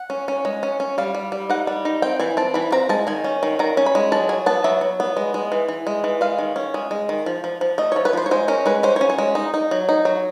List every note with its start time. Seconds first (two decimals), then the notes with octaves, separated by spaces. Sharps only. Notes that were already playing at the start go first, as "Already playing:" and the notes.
Already playing: F#5
0.10 C#4
0.28 C#4
0.45 G#3
0.63 C#4
0.80 C#4
0.98 G3 F5
1.15 G3
1.32 G3
1.50 D#4 F#5
1.67 G3
1.85 D#4
2.02 C4 G5
2.20 E3 G#5
2.37 C4 A5
2.54 E3 B5
2.72 C4 A#5
2.89 G#3 A5
3.07 D#3 G#5
3.24 C#4
3.43 D#3
3.59 D#3 A#5
3.77 C#4
3.86 B5
3.95 G#3
4.12 F#3 A5
4.29 F#3 G#5
4.46 B3 A5
4.64 F#3 E5
4.81 F#3
5.00 B3
5.17 G#3
5.34 G#3
5.52 E3
5.68 E3
5.87 G#3
6.04 E3
6.21 G#3 F5
6.39 D#3
6.56 C#4
6.74 G#3
6.91 G#3
7.09 D#3
7.26 F3
7.44 F3
7.61 F3
7.78 A3 D#5
7.92 F3 C#5
8.05 B4
8.13 F3 C5
8.26 C#5
8.31 G#3 C5
8.48 C#4 A#4
8.66 G#3 B4
8.83 C#4 C5
8.96 C#5
9.01 C#4
9.10 C#5
9.18 G#3
9.35 D#4
9.54 D#4
9.71 F#3
9.89 D#4
10.05 F#3